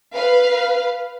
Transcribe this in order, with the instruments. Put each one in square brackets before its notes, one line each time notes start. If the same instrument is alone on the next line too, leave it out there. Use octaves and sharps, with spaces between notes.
[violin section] B4 F5